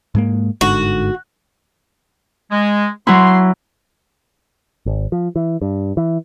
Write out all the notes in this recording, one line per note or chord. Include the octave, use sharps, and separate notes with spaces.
G#2 G#3 A#3
G1 G#2 D3 F#4
G#3
F#3 E4 C6
G#1
F3
E3
G2
E3